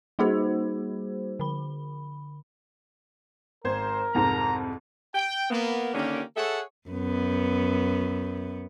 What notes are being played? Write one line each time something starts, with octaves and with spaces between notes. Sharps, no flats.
G3 A#3 D#4 F#4 G#4 C5
D3 B5
G#1 A#4 C5 G#6
C2 F2 G#2 A#5
G5
A#3 B3
D3 D#3 A#3 C#4 G4
G#4 A4 C#5 E5 F#5 A5
F#2 B3